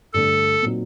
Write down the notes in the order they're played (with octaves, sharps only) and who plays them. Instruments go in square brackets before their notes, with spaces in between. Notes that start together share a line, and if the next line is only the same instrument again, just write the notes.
[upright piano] G2 D3 A3 [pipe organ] A4
[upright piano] A#2 F#3 C4 D#4